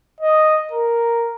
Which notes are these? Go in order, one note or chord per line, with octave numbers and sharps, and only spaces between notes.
D#5
A#4